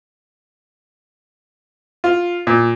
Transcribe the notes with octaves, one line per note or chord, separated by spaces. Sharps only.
F4
A#2